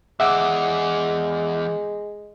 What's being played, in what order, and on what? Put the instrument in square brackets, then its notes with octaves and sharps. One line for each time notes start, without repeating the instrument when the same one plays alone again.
[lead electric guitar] E2 [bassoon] G#3 [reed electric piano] E5 F#5 D6